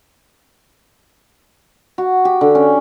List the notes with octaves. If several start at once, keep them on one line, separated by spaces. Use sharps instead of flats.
F#4
G4
D3
C#4